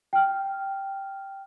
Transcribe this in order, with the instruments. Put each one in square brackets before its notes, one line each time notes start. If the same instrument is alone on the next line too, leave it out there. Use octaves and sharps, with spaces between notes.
[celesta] G5 F6